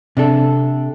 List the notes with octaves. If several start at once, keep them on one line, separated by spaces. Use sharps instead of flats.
C3 D4 A4